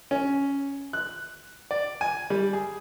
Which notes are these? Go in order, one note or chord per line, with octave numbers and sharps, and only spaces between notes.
C#4
F#6
D5
G#5
G3
G#4